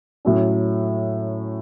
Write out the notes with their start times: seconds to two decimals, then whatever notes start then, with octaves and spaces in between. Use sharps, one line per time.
0.25 A2 F#3 C#4